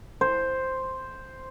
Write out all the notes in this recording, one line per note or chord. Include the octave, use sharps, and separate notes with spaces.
C5